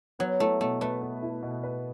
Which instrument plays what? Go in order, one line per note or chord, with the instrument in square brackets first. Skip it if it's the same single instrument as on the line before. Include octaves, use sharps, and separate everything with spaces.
[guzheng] F#3 [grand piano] B3
[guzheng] A3 [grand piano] E4
[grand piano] B2 [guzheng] A3
[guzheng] A3 [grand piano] B4
[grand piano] B3
E4
B2
B4